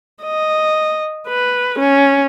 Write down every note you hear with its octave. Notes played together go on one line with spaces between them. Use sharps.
D#5
B4
C#4